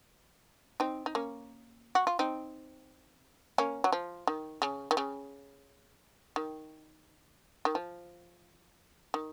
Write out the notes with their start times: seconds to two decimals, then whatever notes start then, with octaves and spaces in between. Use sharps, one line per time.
0.80 C4 D#4
1.06 D#4
1.15 A#3 C#4
1.95 F#4
2.07 F4
2.19 C4 D#4
3.58 A#3 C#4
3.84 F#3
3.92 F3
4.27 D#3
4.62 C#3
4.91 D#3
4.97 C#3
6.36 D#3
7.65 D#3
7.75 F3
9.14 D#3